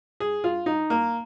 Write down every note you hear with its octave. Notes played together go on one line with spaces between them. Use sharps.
G#4
F4
D#4
A#3